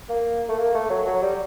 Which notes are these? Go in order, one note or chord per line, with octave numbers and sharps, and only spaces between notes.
A#3
A3
A#3
A3
F#3
F#3
G3